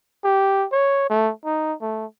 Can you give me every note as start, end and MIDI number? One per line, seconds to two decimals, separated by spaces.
0.24 0.66 67
0.72 1.06 73
1.09 1.31 57
1.45 1.74 63
1.82 2.05 57